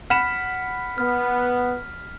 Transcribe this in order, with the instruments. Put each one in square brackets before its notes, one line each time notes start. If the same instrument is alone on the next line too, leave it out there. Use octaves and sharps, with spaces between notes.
[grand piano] F#5 B5 E7 [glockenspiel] F6 B6
[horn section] B3 [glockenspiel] F6